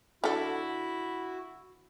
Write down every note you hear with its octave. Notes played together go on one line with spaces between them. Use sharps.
D3 E4 F#4 A4